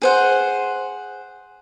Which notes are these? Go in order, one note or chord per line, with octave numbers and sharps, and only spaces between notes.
G#4 C5 F#5